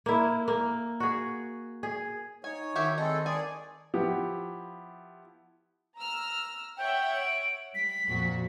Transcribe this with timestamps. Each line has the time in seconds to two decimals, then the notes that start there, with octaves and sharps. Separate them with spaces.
0.06 A#3 E4
0.48 A#3
1.00 F#4 G#4
1.83 G#4
2.44 D#4 C#5 G#5
2.76 D#3 F#4 G4 E5
2.98 G#3 C4 A4 D#5
3.26 G#4 D5 G#5
3.94 F3 B3 E4 G4
5.96 A#5 E6 F6
6.77 C#5 E5 F#5 G5
7.16 D7
7.75 G3 B6
8.07 F2 A#2 F#4